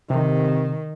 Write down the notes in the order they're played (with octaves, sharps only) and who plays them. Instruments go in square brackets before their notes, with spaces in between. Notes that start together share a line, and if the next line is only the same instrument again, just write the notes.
[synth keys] C3 [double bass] D#3